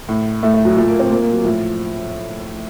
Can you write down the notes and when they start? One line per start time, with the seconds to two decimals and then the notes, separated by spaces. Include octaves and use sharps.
0.09 A2
0.43 A2 A3
0.54 A3
0.65 F#3
0.77 A#2 A3
0.88 A#3
0.99 C4
1.10 A#2 A#3
1.22 A#3
1.33 F#3
1.44 A2 F3